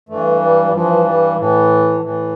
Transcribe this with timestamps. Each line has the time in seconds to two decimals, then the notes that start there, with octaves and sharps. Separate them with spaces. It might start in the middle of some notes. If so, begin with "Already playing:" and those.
0.09 G2 E3 A3
0.41 G3
0.65 G3
0.73 G2 E3 F3
1.05 G3
1.37 A2 E3
2.01 A2 E3